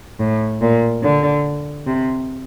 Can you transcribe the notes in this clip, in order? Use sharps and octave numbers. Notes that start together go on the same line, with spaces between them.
A2
A#2
D3
C3